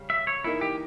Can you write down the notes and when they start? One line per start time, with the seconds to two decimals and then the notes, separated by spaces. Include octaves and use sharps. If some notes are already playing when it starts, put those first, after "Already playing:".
Already playing: C#3 G3
0.10 E5
0.27 C#5
0.44 E3 A#3 D#4 E4
0.61 G4